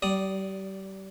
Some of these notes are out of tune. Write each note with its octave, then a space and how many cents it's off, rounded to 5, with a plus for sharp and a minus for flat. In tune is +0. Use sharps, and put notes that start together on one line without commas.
G3 -30 D5 +0 D#6 +0